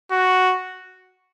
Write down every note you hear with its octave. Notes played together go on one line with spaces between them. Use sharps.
F#4